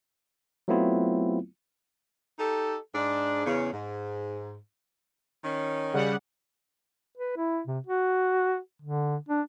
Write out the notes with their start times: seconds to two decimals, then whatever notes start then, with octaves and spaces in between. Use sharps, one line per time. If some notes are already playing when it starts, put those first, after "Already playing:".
0.68 F#3 A3 B3 C4 E4 F4
2.39 D#4 G4 A4
2.95 G#2 D4
3.46 E2 C#3
3.72 G#2
5.44 D#3 C#4
5.93 C#3 G3 F#5
7.17 B4
7.37 E4
7.67 C3
7.87 F#4
8.82 D3
9.29 D4